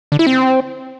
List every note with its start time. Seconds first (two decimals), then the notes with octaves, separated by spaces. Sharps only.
0.12 D3
0.19 E4
0.27 C4